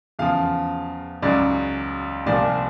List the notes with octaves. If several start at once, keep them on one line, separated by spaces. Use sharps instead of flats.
E2 C#3 F3 F5
C#2 C#3 F#3 D5
C2 A#2 F3 D5